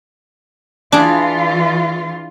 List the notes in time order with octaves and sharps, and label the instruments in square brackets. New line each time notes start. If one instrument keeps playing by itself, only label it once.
[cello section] E3 F4 [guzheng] D4 G#4